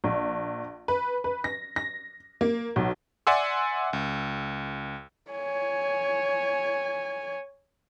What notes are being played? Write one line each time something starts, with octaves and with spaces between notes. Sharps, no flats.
A#1
B4
B4
A#6
A#6
A#3
B1
D5 E5 F#5 G#5 C6 E6
C#2
C#5 G#5